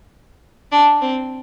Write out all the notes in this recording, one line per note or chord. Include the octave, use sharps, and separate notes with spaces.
D4
C4